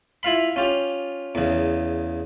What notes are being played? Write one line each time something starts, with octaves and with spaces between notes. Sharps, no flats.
E4 F4 F5 B5
C#4 F4 G4
E2 C#3